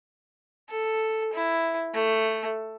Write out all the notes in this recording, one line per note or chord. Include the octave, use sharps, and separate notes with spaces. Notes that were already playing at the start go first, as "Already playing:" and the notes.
A4
E4
A3